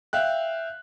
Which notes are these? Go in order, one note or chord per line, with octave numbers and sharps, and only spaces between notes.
E5 F5 G5 F#6